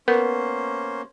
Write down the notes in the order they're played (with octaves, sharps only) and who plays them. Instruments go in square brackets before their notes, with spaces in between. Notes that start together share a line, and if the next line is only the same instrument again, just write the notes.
[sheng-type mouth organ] A#3 C#4 C5 [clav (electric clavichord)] B3 [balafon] A#4